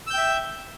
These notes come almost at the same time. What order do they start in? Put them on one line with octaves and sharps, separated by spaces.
E6 G6 G5 E5